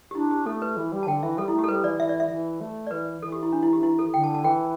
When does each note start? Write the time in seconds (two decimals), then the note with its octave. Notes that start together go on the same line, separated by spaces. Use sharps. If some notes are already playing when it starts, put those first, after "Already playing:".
0.11 G4
0.15 D4 E4
0.31 G4
0.46 A3 A4
0.62 B4
0.77 E3
0.92 G3
1.03 A5
1.07 D3 G5
1.23 E3 E5
1.38 G3 A4
1.48 E4
1.54 A3
1.59 G4
1.64 A4
1.68 G3 B4
1.84 E3 D5
2.00 E3 E5
2.09 D5
2.20 E5
2.30 E3
2.61 A3
2.87 D5
2.91 E3 B4
3.22 E3 A4
3.32 G4
3.43 E4
3.53 D4
3.63 E4
3.73 G4
3.83 E4
3.99 A4
4.14 D3 G5
4.24 A5
4.34 A5
4.44 E3 G5